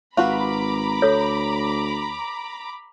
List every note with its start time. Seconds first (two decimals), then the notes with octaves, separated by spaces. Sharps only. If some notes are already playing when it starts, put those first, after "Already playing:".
0.17 G#1 F4 F#4 B4 A#5 B5 D6
1.02 D2 A4 C#5